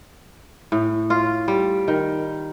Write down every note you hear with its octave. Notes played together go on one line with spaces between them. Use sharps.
A2
F4
G3
D#3